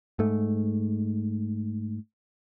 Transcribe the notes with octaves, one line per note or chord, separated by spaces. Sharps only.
G#2 A3